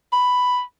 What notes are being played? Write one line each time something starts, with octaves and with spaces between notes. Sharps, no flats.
B5